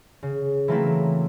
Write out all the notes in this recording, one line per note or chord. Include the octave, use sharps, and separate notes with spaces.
C#3
E3 F#3 A3 A#3 C4 E4